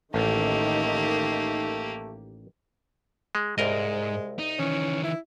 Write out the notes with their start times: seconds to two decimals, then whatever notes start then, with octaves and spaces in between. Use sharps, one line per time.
0.14 A1 D#3 A3 A#3 G4
3.35 G#3
3.58 C2 G#2 G#3 A#4 D#5
4.39 D#4
4.59 D#3 E3 C#4
5.04 E4